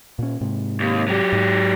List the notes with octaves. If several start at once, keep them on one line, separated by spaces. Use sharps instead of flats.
A#2 C#4
G#2 C3
D#2
F#3 G4
G#2